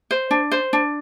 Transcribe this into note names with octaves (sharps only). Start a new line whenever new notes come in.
C5
D4
C5
D4